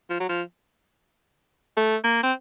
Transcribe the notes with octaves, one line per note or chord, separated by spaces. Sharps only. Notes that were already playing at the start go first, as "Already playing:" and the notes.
F3
F#3
F3
A3
A#3
C4